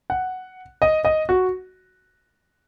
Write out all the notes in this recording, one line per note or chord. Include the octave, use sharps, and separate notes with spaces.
F#5
D#5
D#5
F#4